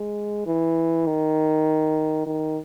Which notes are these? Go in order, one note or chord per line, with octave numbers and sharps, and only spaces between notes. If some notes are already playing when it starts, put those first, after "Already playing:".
Already playing: G#3
E3
D#3
D#3